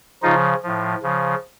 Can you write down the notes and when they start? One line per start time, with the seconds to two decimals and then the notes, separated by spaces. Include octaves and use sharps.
0.23 C#3 F3 D#4 F4
0.63 A2 F3
1.03 C#3 F3